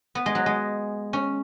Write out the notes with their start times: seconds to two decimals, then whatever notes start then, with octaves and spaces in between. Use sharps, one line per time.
0.15 B3
0.26 G#3
0.35 F#3
0.46 G#3
1.13 C#4